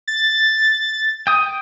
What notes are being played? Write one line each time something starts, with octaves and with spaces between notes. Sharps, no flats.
A6
G5 D#6